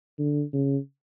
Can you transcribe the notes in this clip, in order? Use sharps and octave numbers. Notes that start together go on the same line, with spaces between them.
D3
C#3